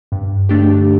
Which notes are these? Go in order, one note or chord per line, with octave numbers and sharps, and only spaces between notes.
G2
D3 A3 D4 G4